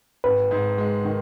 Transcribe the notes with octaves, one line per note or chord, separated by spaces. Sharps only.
G#1 B4
G#2
G#3
D#3